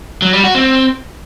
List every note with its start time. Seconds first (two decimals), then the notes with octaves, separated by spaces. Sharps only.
0.22 F#3
0.33 G3
0.44 F#4
0.55 C4